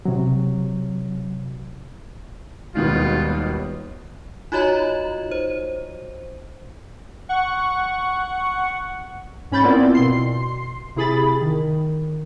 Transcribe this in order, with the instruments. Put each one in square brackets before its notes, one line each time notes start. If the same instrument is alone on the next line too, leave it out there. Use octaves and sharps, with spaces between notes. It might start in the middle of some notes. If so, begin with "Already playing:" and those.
[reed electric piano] C3 F#3
[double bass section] D#2 G3 B3 [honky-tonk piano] B2 D#3 G#3 [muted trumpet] F4
[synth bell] D#4 F4 F#4 C#5 D#5 A#5
C5
[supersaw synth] F#5 C#6
[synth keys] G#2 C#4 B5 G6 A6
B3 C4 E4 F4 A#4 D5
B2 C6 C7
C3 E4 G#4 B5 A6
D#3